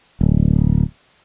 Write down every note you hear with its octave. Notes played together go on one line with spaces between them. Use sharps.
D1